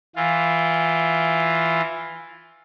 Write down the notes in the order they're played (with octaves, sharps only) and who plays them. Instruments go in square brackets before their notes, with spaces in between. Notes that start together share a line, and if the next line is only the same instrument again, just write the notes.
[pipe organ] E3 F4